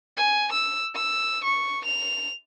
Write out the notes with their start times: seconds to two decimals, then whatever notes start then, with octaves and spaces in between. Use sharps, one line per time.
0.17 G#5
0.52 E6
0.95 E6
1.44 C#6
1.85 F7